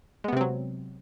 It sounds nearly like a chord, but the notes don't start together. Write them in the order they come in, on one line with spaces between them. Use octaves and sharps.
G#3 B3 C3 C4 F#3